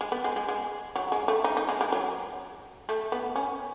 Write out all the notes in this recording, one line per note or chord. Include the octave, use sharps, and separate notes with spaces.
G#3
B3
G#3
G#3
G#3
F#3
G#3
A3
D#4
D#4
G#3
G#3
F#3
A3
B3
C#4